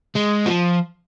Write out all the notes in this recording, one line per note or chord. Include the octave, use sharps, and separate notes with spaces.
G#3
F3